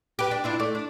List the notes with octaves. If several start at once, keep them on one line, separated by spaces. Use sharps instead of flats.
G4 B4
D4
D4 E4 F4
A3 D5
D4